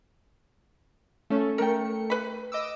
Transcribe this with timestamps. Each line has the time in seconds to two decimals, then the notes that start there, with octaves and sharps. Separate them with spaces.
1.30 A3 C#4
1.58 A3 A#4 G5 C#7
2.10 B4 B5
2.52 D#5 D6 E6